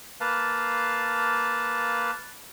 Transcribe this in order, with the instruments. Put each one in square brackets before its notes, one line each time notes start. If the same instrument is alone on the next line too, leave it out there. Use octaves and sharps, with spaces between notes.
[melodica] A#3 B4 F5 A5